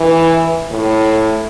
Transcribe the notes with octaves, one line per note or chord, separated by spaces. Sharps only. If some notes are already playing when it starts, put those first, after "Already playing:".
Already playing: E3
A2